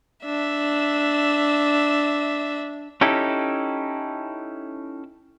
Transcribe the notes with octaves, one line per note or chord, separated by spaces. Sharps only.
D4 E5
C#4 D#4 E4 G4 A4